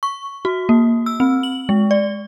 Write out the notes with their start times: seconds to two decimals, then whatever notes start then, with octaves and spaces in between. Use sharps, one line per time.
0.03 C#6
0.45 F#4
0.69 A#3
1.06 E6
1.20 C4
1.43 F#7
1.69 G#3
1.91 D5